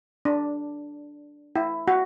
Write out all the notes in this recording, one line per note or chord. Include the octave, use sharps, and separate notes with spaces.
D4
E4
F#4